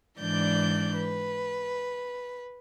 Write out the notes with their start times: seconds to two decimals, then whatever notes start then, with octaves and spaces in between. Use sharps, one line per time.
0.20 G#2 E3 D4 D5 G6
0.97 B4